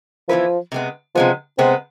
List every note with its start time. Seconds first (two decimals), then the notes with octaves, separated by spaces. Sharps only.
0.28 E3 F3 B3 E4 B4
0.72 C3 G#3 B3
1.15 C3 F3 G#3 B3
1.58 C3 G#3 B3 C4